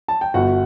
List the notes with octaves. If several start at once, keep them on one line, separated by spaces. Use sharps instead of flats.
A5
G5
G1 F#4 F#5